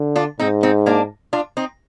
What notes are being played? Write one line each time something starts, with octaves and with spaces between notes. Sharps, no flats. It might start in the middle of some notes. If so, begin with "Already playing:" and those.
Already playing: D3
D4 F4
G#2 C4 D#4
C4 D#4
A#3 D4
D4 F4
C4 D#4